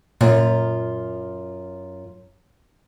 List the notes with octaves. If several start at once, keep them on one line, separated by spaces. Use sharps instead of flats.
F#2 A#2 F4